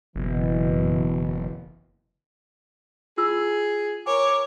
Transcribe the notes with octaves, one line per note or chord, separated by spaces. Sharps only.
F#1 B2 E3
E4 F4 G#4 E6
A#4 C#5 G#5 D6